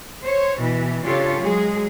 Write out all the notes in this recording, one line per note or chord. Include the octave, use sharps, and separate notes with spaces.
C5 C#5
B2 E3
C#3 D4 F4 G4 A4 C#5
F#3 G#3 G#4